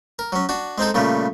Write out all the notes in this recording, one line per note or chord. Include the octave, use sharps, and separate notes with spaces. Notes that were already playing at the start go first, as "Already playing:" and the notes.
A#4
F#3 C#4
D4 F#4
G#3 C4 D#4 A4
A#2 C#3 G3 A3